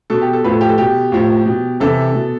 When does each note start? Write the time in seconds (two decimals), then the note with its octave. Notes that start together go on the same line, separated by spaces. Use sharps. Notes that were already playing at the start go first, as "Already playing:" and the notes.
0.10 B2 A4
0.21 G4
0.33 A4
0.44 A2 F3 B4
0.52 A4
0.61 G4
0.69 A4
0.78 B2 G4
1.12 A2 F3
1.46 B2
1.80 C3 E3 A4
2.15 B2